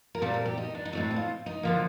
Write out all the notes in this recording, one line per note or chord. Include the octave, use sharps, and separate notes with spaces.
A#4
A#2 G3 C4 A4
A#4
G4
D#4
D4
D#4
A2 A3 C4 D4
D#4
F4
D#4
D3 F3 A#3